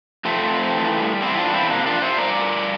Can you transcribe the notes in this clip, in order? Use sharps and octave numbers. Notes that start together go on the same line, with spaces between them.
F2 A3 C4
F2
E3
G3
E2 C4 E4
D4 F4
E2
C4 E4
C3 A#3 D4
D4 F4
F3
C5 E5
G2 A#4 D5
G2